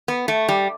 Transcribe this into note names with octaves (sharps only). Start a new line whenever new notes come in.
B3
A3
G3